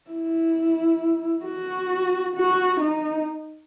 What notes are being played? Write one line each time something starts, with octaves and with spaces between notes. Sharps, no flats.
E4
F#4
F#4
D#4